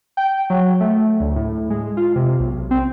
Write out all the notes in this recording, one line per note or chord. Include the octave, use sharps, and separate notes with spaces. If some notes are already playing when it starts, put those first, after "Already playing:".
G5
F#3
A3
D2
A2
G#3
F4
C3
B1
C4